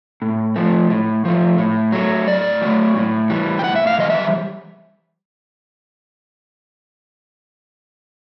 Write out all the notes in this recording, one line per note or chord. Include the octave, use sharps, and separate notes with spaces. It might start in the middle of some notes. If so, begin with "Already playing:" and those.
A2
F3 A3
A2
F3 A3
A2
F#3 A3
A2 D5
F#3 A3
A2
E3 G3
G5
A2 F#5
E5
F5
E3 G3 D#5
E5